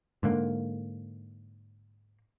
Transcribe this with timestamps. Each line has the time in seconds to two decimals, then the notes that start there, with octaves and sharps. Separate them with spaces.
0.23 G#2 D3 A#3